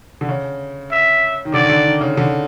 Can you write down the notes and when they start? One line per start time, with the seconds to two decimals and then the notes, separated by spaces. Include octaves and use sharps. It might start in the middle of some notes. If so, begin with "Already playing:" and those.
0.21 D3
0.29 C#3
0.92 E5
1.45 D#3
1.54 D3 D5
1.63 D#3
1.69 D3
1.85 D#3
2.01 C#3
2.17 D3